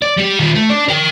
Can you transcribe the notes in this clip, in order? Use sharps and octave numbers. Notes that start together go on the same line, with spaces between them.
D5
G3 G4
D#3 F4
A3
D4 D5
A#4 G5